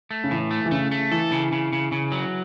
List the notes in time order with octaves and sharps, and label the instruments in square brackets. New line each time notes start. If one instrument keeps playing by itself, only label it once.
[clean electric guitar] A3
[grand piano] C#3
[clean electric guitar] A2 [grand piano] E3
[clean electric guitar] A3
[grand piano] E3
[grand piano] C#3 [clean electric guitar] A3
[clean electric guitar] A3
[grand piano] E3 [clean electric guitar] A4
[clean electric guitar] C#3
C#3
C#3
C#3
F#3